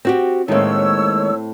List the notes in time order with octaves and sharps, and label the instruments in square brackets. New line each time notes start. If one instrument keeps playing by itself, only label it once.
[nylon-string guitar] C4 F#4 G4
[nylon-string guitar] A2 C4 [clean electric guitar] D#3 G#3 A#3 [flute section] C#5 E6